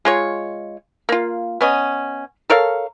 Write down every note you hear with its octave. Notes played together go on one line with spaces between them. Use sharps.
G#3 F4 C#5
A#3 F4
B3 C#4 D#5
A4 A#4 C#5 F5